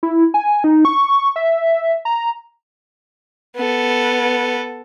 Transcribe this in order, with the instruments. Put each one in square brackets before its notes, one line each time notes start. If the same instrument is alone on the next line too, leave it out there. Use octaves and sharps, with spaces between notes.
[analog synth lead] E4
G#5
D#4
C#6
E5
A#5
[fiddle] B3 A4